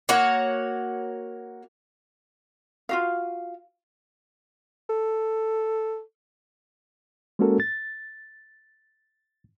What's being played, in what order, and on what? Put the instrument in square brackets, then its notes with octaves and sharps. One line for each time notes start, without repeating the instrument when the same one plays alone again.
[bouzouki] A#3 F#4 C#5 F#5
[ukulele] F4 F#4 F5
[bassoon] A4
[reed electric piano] G#3 A#3 C#4 F#4 A4 A#4
A6